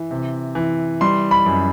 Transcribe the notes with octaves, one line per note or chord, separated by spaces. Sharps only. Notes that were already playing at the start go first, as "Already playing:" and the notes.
Already playing: E3
C3
E3
G3 C6
B5
F#2